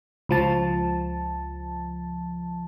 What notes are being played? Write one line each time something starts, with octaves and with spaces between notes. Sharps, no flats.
C#2 F3 A5